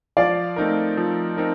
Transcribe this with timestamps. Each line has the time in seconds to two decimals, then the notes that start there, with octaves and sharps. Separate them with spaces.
0.17 F3 D5 F5
0.56 A3 C4 D#4 A#4
0.97 F3
1.37 C4 D#4 A#4